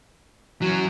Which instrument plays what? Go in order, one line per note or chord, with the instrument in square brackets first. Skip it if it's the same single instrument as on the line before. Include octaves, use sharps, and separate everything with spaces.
[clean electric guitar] E3 [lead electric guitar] F#3 C#4